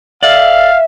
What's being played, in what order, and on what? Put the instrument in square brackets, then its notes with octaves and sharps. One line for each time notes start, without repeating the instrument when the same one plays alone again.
[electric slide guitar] A4 D5 [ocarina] E5 [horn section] F5